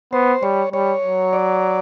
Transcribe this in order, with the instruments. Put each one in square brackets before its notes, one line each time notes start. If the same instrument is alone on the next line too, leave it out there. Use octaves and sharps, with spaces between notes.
[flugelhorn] B3 [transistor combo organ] C5
[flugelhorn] G3 [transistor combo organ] C#5
[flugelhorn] G3 [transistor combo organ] C#5
[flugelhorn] F#3
[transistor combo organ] D5